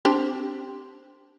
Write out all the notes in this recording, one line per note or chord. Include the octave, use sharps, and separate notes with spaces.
C4 D4 G4